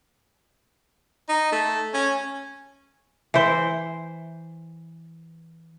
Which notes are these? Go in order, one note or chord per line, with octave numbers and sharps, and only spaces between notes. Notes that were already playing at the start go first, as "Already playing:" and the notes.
D#4
A3
C#4
E3 C5